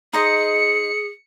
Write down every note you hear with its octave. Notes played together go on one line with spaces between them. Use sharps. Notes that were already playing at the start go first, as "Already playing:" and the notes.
D#4 G#4 C5 D#5 C#7